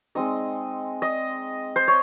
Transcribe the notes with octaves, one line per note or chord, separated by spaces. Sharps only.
G#3 C4 D#4 D#5
D#5
C5
C#5